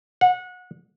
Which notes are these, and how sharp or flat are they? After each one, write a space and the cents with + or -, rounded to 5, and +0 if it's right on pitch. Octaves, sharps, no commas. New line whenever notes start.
F#5 -25